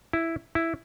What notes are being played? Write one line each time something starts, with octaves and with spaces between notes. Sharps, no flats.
E4
E4